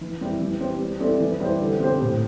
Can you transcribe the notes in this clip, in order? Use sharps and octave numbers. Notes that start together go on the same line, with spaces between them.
E3
G3 C4 E4 G4
E3
C4 G4 C5
G3
C4 E4 A4 D5
E3
G3 E4 G4 C5
D3
C4 G4 C5
A2